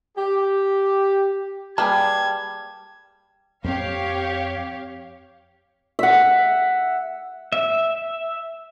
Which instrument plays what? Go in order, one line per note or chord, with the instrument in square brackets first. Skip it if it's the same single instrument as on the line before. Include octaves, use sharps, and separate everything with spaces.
[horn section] G4
[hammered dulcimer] G3 [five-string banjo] A#3 G#4 B4 [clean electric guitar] A5 [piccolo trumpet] G#6
[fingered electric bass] F2 C4 [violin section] G4 C#5 F5
[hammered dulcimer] E5 F#5
[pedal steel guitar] E5